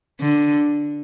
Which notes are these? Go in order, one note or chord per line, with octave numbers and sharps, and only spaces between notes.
D3